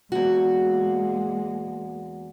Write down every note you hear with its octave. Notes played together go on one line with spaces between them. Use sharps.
E2 G#3 A#3 F#4